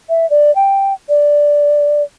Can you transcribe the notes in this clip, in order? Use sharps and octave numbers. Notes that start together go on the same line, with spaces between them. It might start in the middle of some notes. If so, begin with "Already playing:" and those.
E5
D5
G5
D5